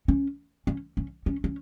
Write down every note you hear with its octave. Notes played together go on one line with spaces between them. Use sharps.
C#4
C#4
C#4
C#4
C#4